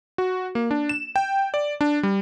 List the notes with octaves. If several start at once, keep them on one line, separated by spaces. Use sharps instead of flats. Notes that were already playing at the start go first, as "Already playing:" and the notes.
F#4
A#3
D4
E7
G5
D5
D4
G3